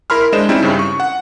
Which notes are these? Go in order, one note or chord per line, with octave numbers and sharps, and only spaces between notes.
E4 A#4 B5 C6 F6
G#3 D4 C5 D#5 E7
G3 C4 C#4 D#4 E4
G2 C#3
C#6
F#5